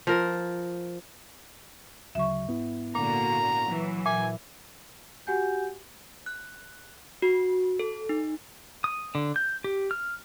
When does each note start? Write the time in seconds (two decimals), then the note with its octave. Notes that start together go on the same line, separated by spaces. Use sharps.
0.07 F3 A#4
2.15 D2 C#3 F#3 E5 C#6
2.47 G#2 B3 E4
2.95 A#2 D3 A#3 F#4 A#5
3.64 E3 F#3
4.06 A#2 E5 G#5
5.27 F#4 G4 F#5 G#5 G6
6.26 F#6
7.22 F#4
7.79 A4
8.09 D#4
8.84 D#6
9.15 D3
9.36 G6
9.64 G4
9.91 F6